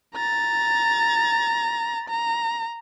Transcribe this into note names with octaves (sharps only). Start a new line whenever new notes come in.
A#5 A6
A#5